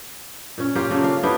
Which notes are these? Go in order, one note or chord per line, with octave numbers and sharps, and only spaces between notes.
A#2 C#4
A#3 F4 G4
C#3 A3
D4 F5
B3 D4 E4 G4